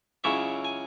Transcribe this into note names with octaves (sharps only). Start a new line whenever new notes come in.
C#2 C#3 F#3 C#4 E4 E5
G#5